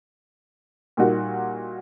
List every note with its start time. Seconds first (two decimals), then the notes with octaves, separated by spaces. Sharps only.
0.97 A#2 G3 A#3 D#4 F#4